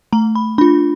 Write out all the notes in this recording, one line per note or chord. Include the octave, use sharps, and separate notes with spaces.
A3 A#5
B5
D4 F4 B5